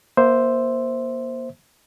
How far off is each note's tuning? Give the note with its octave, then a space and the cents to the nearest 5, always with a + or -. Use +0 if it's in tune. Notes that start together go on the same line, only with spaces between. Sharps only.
A#3 +25 C5 +0 E5 +0